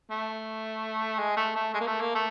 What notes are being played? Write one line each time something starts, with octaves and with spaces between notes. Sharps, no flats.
A3
G#3
A3
A3
G#3
A#3
A3
A#3
A3